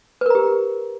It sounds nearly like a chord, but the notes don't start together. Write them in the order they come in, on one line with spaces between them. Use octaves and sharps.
B4 A#4 A#5 G4